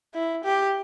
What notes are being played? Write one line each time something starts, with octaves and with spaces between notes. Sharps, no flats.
E4
G4